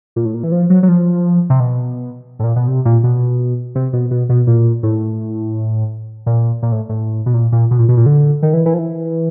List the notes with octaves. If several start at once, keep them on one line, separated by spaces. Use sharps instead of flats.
A#2
A2
A#2
E3
F3
F#3
F#3
F3
C3
B2
A2
A#2
B2
C3
A#2
B2
C3
B2
B2
B2
A#2
A2
A#2
A#2
A2
A2
B2
A#2
A#2
B2
A#2
B2
A#2
D3
D#3
E3
E3
F3
E3